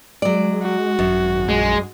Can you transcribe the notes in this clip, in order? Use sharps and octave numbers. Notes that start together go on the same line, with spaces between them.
F#3 G#3 D5
F#4
G#1 F#2
A#1 G#3